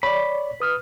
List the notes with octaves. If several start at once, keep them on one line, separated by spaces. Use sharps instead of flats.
C#5 D5 B5
B4 D#6 F6